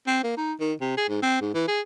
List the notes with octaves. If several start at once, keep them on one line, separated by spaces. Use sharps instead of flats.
C4
A#3
D#4
D#3
C3
G#4
G#2
C4
G#2
E3
G#4